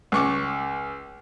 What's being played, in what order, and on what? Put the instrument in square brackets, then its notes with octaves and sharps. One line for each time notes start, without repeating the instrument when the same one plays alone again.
[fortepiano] C#2 C#6 D6